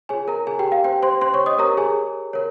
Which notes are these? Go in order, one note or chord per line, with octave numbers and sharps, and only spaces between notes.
F4 G#4 C#5 G#5
A#4 A#5
G#4 G#5
G4 G5
F5
G4 C5 G5
C5 C6
C5 C6
C#5 C#6
D#5 D#6
G4 A#4 C#5 A#5
G#4 G#5
A#4 C#5